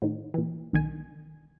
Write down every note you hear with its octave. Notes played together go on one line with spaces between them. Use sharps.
A2 D#3
A#2 E3
B1 D#3 G#5